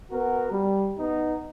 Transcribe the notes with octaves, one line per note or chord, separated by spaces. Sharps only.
B3 F#4 A#4
G3
B3 D#4